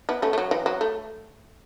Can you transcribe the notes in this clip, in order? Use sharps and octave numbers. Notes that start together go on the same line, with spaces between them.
B3 E4
A3 C#4
A3
F#3
E3
F#3
A3